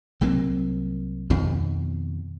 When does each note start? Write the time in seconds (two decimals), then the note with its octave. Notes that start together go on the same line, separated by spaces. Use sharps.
0.21 C2 F#3 A#3 C4
1.30 F2 B2 D#3